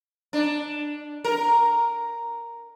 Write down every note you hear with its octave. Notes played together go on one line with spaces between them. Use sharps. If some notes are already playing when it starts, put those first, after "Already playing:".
D4
A#4